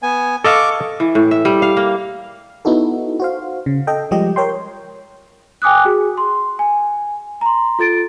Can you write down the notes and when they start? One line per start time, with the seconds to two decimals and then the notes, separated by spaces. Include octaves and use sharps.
0.03 B3 G#5
0.44 A4 D#5 F5 C#6 D6
1.00 E3
1.15 A2
1.31 E5
1.45 G3
1.62 F5
1.77 A#3
2.65 B3 D#4 E4 F#4 A4
3.20 F#4 C5 F5
3.66 C#3
3.87 A4 D#5 G5
4.11 F3 G3 G#3 G4 D#5
4.36 A#4 C#5 G5 C6
5.62 G5 G#5 D6 D#6 F#6
5.85 F#4 G#4
6.17 C6
6.59 G#5
7.41 A#5 C6
7.79 F4 A4 A6 D7